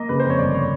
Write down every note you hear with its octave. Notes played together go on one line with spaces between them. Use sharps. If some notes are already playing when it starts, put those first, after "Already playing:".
Already playing: A#3 D#5
C#3 B4
F2 C5
C#5
G1 D5
C#5